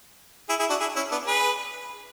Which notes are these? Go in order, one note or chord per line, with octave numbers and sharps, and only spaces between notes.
E4 G#4
E4 G#4
D4 F#4
E4 G#4
C#4 E4
B3 D4
G#4 B4